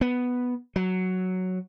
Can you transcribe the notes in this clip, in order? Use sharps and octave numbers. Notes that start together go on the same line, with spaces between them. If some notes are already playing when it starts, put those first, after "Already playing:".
B3
F#3